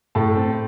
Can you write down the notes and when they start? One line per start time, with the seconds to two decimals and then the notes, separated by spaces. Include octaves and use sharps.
0.15 A2 A5
0.37 C4